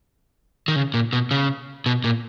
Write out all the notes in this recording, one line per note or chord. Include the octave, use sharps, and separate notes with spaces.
D#3
C#3
A#2
B2
C#3
B2
A#2